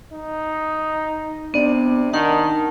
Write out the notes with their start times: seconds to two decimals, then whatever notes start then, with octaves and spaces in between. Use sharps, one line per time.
0.12 D#4
1.54 C3 B3 D4 D5
2.13 D#3 D#4 A#4 F#5 A5